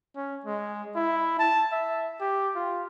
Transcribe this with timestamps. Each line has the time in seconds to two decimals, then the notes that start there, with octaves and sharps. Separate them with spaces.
0.16 C#4
0.45 G#3
0.96 E4
1.39 A5
1.72 E5
2.20 G4
2.55 F4